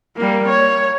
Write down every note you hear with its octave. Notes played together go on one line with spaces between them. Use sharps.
G3 A#3
C#5